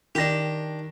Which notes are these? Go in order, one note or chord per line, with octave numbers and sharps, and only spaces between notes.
D#3 D4 G4 A#6